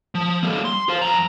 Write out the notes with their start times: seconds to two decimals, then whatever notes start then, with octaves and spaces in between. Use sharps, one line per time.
0.15 F3
0.43 G3 A#3
0.65 C6
0.89 C5 F5
1.02 F2 A#5